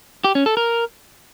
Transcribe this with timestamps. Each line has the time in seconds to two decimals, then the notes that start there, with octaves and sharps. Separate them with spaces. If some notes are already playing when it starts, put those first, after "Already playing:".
0.24 G4
0.35 C#4
0.46 A4
0.57 A#4